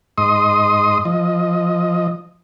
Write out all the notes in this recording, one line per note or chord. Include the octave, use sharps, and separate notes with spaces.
G#2 D#5 C6 D#6
F3 D#5